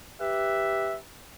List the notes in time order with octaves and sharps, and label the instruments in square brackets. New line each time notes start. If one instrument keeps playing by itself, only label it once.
[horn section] G4 B4 E5